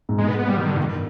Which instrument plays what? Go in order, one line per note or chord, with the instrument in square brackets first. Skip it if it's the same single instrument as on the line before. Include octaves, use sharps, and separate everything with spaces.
[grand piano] G#2
[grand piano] B2 [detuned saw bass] G#3
[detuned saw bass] B3
B3
G3
D#3
D3
[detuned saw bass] G2 [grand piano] D#3